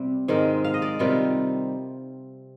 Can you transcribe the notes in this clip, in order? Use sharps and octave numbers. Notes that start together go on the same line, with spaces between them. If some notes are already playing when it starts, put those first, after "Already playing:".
Already playing: C3 G3 C4
G#2 D#3 G#3 C4
F5
D#5
D5
C3 D#3 G3 F4